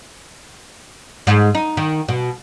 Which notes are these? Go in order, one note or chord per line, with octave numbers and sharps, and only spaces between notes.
G#2
D#4
D#3
B2